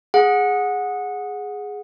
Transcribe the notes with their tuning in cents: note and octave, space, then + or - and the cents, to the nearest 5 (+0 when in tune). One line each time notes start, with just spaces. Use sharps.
G#4 +0 F#5 -20